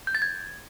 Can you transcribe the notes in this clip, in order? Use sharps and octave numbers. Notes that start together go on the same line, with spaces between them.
G6
A6
G#6